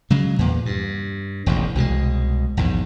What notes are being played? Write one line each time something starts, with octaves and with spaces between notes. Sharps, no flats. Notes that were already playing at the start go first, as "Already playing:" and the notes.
C#3 F#3 G#3
E2 A#2
G2
E1 A1 E2
C2 B2 D#3 G#3
A#1 E2 G#2